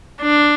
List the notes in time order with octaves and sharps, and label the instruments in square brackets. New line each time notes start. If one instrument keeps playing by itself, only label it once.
[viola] D4